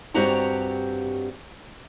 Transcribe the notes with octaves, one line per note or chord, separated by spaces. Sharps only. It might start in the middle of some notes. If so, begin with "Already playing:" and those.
G2 C4 F#4 G4 C#5 A#5